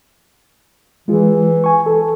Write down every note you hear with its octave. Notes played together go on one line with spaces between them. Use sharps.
E3 G#3 F4 G#4
G#5 C#6
A4